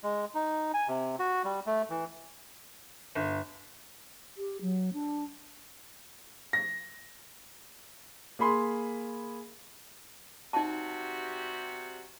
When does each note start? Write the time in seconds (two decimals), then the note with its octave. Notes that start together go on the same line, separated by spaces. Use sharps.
0.03 G#3
0.35 D#4
0.74 G#5
0.88 C3
1.19 F#4
1.45 G3
1.66 A3
1.90 E3
3.15 G1
4.37 G4
4.61 F#3
4.93 D4
6.53 A#6
8.39 A#3 G#4 B5 C6
10.53 C3 G3 D#4 F#4 A5